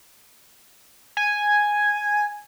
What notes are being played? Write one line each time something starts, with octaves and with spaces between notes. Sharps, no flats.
G#5